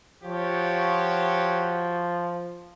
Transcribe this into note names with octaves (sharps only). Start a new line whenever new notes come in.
F3 F#4 G4 C#5